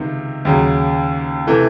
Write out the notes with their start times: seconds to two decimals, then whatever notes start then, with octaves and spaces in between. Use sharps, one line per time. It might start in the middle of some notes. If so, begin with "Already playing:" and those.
Already playing: C#2 C3 D#3
0.45 D#2 C#3 F#3
1.47 C3 E3 A3